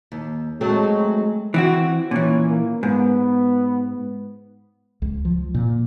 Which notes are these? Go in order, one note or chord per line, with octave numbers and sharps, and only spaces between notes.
D#2
F#3 G#3 A3 C4
E3 C4 F#4
A#2 E3 C#4
A#3
G#2 B3
C#2
F3
A#2